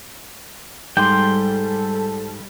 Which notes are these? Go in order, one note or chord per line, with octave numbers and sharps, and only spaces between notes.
G#2 G3 A4 G5 C6